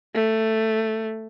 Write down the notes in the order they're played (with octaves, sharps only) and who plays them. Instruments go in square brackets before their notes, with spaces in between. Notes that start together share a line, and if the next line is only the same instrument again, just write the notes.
[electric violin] A3